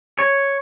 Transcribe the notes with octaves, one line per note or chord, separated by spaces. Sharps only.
C#5